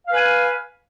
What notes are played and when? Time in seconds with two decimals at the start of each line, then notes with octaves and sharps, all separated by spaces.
0.07 F5
0.11 B4
0.16 G#5